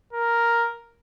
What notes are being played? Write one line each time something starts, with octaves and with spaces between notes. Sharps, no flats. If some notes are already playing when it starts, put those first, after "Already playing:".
A#4